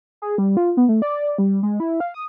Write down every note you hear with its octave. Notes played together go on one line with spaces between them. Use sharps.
G#4
G3
F4
B3
A3
D5
G3
G#3
E4
F5
D#6